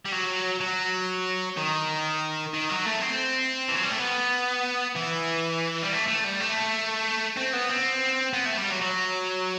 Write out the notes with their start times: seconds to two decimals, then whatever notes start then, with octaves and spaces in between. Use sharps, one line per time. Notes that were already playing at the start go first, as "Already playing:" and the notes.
0.05 G3
0.12 F#3
0.61 F#3
1.57 D#3
2.54 D#3
2.70 F#3
2.86 A3
2.99 B3
3.02 C4
3.68 E3
3.75 F#3
3.83 G3
3.91 A3
3.99 B3
4.95 E3
5.83 G3
5.92 A3
6.08 A3
6.24 G3
6.40 A3
7.36 C4
7.53 B3
7.69 C4
8.33 B3
8.45 A3
8.58 G3
8.70 F#3
8.81 F#3